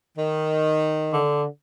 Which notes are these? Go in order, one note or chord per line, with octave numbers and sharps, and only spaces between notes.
D#3
D3